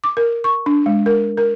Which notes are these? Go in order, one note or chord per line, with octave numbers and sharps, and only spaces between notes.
D6
A#4
C#6
D4
G#3
A#4
A#4